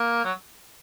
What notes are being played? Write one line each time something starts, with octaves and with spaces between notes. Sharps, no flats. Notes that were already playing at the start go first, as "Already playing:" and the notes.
Already playing: A#3
F#3